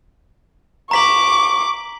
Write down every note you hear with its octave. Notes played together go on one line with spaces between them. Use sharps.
A#5 C#6 D6 B6 F#7